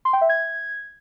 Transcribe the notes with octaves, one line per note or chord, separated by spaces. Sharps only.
C6
G5
E5
G#6